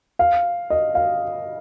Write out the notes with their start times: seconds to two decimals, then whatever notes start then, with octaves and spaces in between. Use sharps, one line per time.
0.19 F5
0.70 D#5
0.95 F5